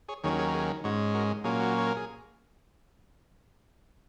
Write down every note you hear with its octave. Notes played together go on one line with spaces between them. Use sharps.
G#4 C#5
D#2 D#3 F#3 C#4 G#4 C#5
G#4 C#5
A#4
G#4
G#2 G#3 C#4 F#4
F#4 A#4
A#2 F#3 A#3 C#4 G#4
F#4
C#5
A#4
G#4